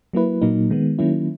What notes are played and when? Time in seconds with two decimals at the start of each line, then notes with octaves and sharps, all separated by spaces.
0.13 F#3 A#3 E4 B4
0.42 A#2 F#3 A#3 D#4
0.70 D#3 G#3 B3
0.99 D#3 F#3 A#3 C#4 E4